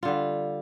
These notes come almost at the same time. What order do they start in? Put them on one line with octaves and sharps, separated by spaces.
F4 D3 G3